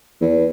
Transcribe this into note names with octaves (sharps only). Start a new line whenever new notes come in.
E2